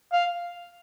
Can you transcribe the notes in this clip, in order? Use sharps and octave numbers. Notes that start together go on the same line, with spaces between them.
F5